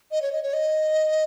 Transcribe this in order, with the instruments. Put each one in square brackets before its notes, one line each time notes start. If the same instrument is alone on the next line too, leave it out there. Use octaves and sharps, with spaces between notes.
[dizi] D#5
C#5
D#5
C#5
D#5